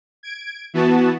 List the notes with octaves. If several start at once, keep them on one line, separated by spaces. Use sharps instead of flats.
G#6 D7
E3 B3 F#4 A5